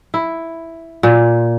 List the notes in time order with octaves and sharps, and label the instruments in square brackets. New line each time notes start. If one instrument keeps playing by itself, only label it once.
[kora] E4
A#2